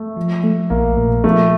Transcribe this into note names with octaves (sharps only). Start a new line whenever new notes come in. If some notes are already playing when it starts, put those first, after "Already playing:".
Already playing: A3
F3
A3
A#1 A#3
A#2
F3 A3